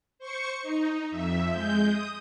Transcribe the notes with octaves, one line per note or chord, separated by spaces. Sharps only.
C5 C#6 C#7
D#4
F2 E5
G#3 G6
D#6